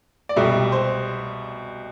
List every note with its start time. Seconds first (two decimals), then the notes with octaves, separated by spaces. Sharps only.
0.29 D5
0.36 C2 B2 G3 E5
0.72 C5